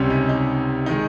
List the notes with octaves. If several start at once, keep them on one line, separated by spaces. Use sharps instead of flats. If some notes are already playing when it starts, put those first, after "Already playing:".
Already playing: C#2 C3 G3 C4 C#4
D#4
D#4
D#3 G#3 D#4